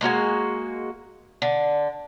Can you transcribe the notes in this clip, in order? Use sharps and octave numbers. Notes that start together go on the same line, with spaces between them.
G#3 A#3 F#4 G#5
D3